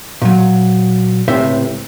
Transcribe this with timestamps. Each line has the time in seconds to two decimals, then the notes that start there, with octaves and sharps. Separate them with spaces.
0.22 A#2 F#3
1.28 C#2 A2 C3 C5 E5